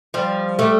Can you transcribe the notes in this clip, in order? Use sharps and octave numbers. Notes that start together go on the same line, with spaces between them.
F3 G3
G3 A3